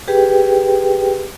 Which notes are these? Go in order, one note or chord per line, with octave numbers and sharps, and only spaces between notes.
G4 G#4 B4 G5